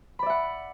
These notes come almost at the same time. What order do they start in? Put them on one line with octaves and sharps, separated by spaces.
B5 D5 E5 F#5